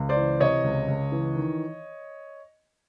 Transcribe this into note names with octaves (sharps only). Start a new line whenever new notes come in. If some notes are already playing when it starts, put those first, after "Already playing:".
Already playing: C#2
C5 D5
E3
C3 C#5 D#5
C#2
C#2
E3
D#3